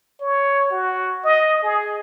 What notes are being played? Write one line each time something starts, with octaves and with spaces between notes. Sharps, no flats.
C#5
F#4
D#5
G#4